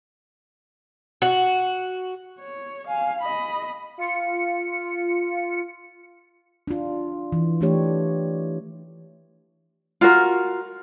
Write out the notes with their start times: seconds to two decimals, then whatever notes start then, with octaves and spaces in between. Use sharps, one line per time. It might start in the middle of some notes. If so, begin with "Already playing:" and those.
1.22 F#4
2.39 C#5
2.87 F5 G#5
3.21 D#5 B5
3.98 F4 C#7
6.67 D4 F4
7.32 E3
7.61 E3 A3 D4 G4 C#5
10.01 F4 F#4 A#4